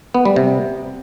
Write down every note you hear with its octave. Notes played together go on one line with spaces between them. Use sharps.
B3
G3
C3